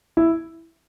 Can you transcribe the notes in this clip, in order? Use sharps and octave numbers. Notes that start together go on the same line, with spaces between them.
E4